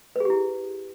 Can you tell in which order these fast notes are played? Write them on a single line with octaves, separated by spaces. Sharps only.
B4 G#4 G4 E4